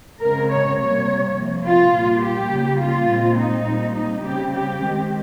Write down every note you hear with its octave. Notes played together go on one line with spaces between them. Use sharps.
C#3 G#3 C4 A#4
C#5
C3 G3 A#3 C#5
C3 F3 A#3
F4
A#2 G3 A#3
G4
C#3 G3 A#3
F4
A#2 G#3 C4
D#4
A#2 G3 C4
D#4
C#3 G3 C4 G4
G4
D#3 G#3 C4